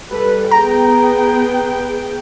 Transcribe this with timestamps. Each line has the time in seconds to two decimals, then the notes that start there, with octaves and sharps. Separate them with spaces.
0.11 G3 A4 B4
0.51 B3 G#4 G5 A#5